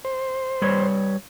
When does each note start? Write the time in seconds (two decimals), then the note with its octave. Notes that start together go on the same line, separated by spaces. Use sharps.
0.05 C5
0.62 G3 B4 C#5